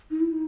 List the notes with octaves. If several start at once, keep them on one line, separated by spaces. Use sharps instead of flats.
D#4
E4
D#4